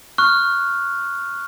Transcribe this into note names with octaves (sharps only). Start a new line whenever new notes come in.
C#6 F6 F#6